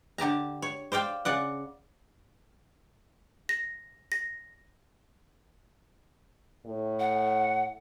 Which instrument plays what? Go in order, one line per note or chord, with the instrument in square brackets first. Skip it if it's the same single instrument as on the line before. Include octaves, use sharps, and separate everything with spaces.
[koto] D3 G4 A5 A#5
C#5
C5 D5 F5 G5
C#3 D5 F#5
[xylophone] A#6
A#6
[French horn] A2
[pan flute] F#5